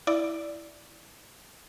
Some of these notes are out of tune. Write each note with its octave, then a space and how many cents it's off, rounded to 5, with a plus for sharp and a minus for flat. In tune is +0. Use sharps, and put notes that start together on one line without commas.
E4 +0 D5 +0